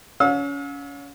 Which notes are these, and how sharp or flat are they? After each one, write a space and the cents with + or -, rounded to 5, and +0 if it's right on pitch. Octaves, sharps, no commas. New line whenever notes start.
C#4 +25 F5 +40 E6 -25